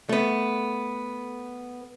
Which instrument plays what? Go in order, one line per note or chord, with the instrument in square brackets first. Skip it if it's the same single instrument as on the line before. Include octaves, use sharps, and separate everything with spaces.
[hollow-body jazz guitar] A3 B3